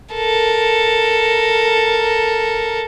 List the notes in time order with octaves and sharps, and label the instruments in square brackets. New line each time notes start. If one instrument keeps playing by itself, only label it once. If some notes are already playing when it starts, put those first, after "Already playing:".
[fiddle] A4 A#4